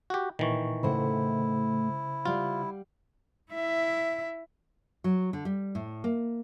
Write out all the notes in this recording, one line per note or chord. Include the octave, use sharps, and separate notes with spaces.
F#4 G4
A#2 D#3 E3 C#6
A2 C#3 A3 E4 C5 F#5
G3 F4 F5 F#5
E4 E5
F#3
D3
G3
A2
A#3